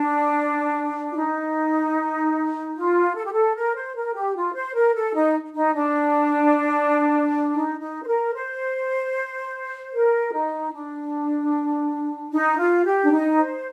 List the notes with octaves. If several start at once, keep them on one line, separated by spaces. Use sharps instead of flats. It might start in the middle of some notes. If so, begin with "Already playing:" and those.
Already playing: D4
F4
D#4
F4
A4
G4
A4
A#4
C5
A#4
G4
F4
C5
A#4
A4
D#4
D#4
D4
D#4
D#4
C5
A#4
C5
A#4
D#4
D4
D#4
F4
G4
D4
D#4
C5